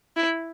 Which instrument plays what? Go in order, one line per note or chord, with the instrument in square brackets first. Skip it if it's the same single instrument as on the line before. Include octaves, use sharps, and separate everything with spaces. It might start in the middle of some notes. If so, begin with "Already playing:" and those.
[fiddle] E4